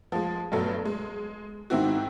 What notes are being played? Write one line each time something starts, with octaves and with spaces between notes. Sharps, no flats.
F3 G#3
G2 B2 F#3 A3
G#3
G#2 D#3 C4 E4 F#4